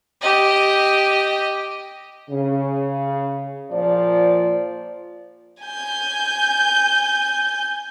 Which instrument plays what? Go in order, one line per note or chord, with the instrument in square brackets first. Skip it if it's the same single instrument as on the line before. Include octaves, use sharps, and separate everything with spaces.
[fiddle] G4 D#5
[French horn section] C#3
A#2 F3 C5 D5
[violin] G#5 G6